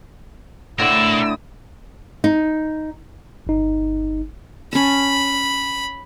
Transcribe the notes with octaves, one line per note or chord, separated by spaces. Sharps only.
A2 D3 A#4 D5 E6
D#4
G1 D#4
C#4 A5 B5